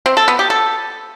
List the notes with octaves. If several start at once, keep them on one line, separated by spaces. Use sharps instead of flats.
C4
A4
B3
G4
A4